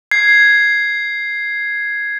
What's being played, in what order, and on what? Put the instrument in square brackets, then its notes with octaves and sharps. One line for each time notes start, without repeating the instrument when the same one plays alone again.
[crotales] G#6 C7